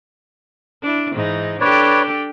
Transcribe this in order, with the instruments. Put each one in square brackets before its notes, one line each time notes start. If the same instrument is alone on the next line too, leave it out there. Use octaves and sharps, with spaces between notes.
[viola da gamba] D4 E4
G#2 E3 D#4
[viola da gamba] D4 G4 A4 [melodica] B4 C#5 D5